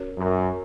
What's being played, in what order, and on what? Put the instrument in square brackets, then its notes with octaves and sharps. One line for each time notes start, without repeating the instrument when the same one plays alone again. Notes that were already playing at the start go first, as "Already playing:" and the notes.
Already playing: [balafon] C#4 F#4 A#4 C#5
[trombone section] F#2